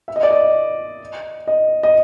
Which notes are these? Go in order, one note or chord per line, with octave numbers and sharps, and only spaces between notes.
E5
D#5
D5
D#5
D#5
D#5